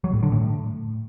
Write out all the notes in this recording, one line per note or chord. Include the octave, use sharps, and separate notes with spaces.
F#3
A2
D3
A2